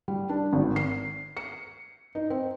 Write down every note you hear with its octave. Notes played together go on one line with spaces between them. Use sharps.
G3
D4
G#1
C7
C#7
D#4
C4